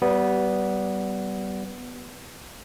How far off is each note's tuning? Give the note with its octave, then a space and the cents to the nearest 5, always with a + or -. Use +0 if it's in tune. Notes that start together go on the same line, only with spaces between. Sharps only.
G3 -25 B3 +0